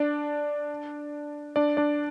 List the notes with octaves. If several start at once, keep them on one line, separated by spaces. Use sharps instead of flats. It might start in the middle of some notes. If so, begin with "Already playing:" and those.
Already playing: D4 D5
D4 D5
D4 D5